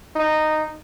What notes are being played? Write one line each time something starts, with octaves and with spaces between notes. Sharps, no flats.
D#4